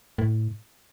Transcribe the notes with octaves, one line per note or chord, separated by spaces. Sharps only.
A2